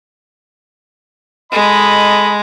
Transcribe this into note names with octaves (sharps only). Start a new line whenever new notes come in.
G#3 A4 D#5 B5